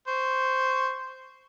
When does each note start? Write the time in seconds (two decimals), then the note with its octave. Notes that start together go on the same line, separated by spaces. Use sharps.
0.08 C5 C#6